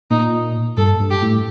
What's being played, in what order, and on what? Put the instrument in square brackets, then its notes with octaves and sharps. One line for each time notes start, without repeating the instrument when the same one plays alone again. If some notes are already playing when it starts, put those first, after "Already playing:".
[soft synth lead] A#2 [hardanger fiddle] D#4
[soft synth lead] G2 [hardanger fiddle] A4
[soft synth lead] G2
[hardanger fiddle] G4
[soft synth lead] A2